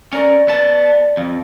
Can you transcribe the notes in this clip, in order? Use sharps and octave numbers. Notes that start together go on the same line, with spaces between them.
C#4 A#4 D5
B3 D5 A5
F2